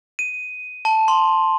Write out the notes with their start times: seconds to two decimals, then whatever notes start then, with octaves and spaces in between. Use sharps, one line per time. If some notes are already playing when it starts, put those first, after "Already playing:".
0.19 D#7
0.85 A5
1.08 C6